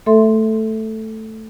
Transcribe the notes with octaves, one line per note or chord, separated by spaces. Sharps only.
A3 A4 E5 C6